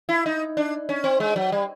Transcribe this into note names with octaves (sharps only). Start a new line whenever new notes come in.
E4
D#4
D4
C#4
C4
G#3
F#3
G3